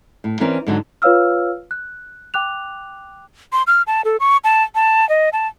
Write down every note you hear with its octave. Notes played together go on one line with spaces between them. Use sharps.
A2
E3 C4 C#4 A#4 D5
G#2 D3 F#3
F4 B4 C#5 F5 E6 F6
F#6
G5 D6 F#6 F7
C6
F6
A5
A4
C#6
A5
A5
D#5
A5